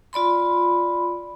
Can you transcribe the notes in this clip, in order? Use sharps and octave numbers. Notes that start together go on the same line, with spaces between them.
F4 D5 B5 C6